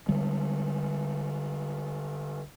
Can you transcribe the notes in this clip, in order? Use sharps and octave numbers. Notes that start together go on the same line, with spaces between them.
D3 G3 G#3